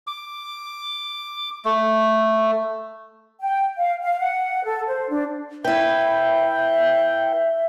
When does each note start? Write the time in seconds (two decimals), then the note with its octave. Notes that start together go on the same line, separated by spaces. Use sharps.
0.07 D6
1.65 A3
3.41 G5
3.78 F5
4.02 F5
4.19 F#5
4.65 A4
4.87 C5
5.09 D4
5.65 E4 B4 E5 G5